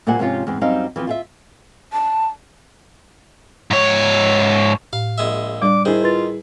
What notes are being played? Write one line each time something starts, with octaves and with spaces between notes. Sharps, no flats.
A#2 G3 A#3 C5 F#5 G#5
G#2 C3 F3 C4 C#4 F4
E2 G#2 C4
F#2 G3 C4 D#4 C5 F5
E3 F3 B3 C4
F4 G#4 E5
A5
G#2 C#5
A2 F5
A#1 G#3 E5
G3 D4 D6
D#3 E4 G#4 C5
F4 B4 A6